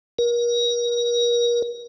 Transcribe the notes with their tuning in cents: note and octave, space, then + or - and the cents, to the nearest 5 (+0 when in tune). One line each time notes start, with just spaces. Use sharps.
A#4 +35